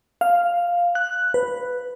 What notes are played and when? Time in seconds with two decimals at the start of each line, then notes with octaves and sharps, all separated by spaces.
0.21 F5
0.95 F#6
1.34 B4